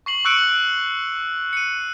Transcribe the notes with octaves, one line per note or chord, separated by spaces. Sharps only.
C#6 C7 F#7
C#6 E6 F#6 C#7 D7 F#7
C#7 D#7